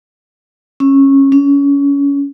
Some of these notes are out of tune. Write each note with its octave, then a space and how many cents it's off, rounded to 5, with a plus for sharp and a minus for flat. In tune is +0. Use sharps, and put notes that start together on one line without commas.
C#4 -20
C#4 +25